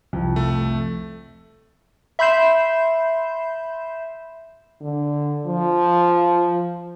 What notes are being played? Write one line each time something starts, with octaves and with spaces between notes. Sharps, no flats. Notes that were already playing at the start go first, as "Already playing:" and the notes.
C2 F2 F3
A3
E5 B5 C6 G6 C7 E7
D3
F3